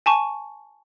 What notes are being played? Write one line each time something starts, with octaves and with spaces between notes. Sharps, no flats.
G#5 A5 C#6